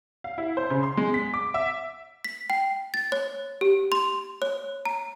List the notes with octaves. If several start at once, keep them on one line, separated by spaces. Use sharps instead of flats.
F5
E4
C5
C#3
C6
G#3
B6
D6
E5
B6
G5
A6
C#5
G4
C6
C#5
A#5